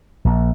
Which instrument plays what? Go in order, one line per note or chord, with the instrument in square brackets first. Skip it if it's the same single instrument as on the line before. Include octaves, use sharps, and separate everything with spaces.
[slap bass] A#1